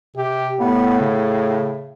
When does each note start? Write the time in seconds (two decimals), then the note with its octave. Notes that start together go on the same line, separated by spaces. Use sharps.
0.16 C3 G4
0.60 A2 B3
1.01 C#3